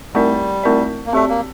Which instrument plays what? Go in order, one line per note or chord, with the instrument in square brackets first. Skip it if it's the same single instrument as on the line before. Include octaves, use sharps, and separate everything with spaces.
[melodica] G3 [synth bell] A3 C4 E4 A#4 D5
[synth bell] A3 C4 E4 A#4 D5
[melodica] A#3
[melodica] A3 [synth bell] C4 G4 D5
[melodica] A#3